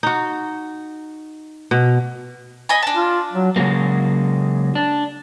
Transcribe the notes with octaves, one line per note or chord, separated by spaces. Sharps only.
D#4 F#4
B2
D#5 G#5 B5
D4 A5
F4
F#3
C#3 F#3 G#3 A#3
D4